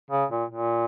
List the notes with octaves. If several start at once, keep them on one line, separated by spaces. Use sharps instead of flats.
C#3
A#2
A#2